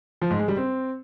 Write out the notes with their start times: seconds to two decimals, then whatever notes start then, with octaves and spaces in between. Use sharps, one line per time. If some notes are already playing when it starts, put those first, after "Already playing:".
0.22 F3
0.30 G#2
0.39 G#3
0.48 G3
0.57 C4